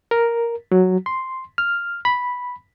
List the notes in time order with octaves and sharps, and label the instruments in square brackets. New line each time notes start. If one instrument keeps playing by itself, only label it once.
[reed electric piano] A#4
F#3
C6
F6
B5